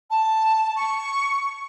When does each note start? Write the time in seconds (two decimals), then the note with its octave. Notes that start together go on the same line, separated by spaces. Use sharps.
0.11 A5
0.76 C#6